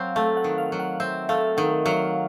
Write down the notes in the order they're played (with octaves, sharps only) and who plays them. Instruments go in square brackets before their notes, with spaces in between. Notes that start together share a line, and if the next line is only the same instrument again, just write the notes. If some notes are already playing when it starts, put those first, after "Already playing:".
Already playing: [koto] F#3 C4 [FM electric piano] F5
[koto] A3 [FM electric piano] F5
[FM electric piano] F#5
[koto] D#3
[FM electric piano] F5
[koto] F#3
[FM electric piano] F#5
[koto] C4 [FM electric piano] E5
[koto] A3 [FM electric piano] F5
[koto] D#3 [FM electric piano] F#5
[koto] F#3 [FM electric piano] F5